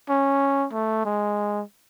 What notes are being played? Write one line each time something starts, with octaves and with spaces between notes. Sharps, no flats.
C#4
A3
G#3